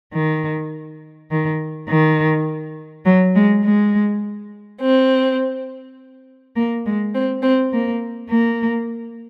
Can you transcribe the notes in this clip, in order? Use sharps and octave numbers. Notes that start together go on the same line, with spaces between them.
D#3
D#3
D#3
F#3
G#3
G#3
C4
A#3
G#3
C4
C4
A#3
A#3